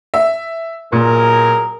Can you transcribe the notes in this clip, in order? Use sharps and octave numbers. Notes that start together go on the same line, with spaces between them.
E5
B1 A#2 G#4 A#4